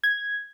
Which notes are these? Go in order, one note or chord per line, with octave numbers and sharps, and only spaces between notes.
G#6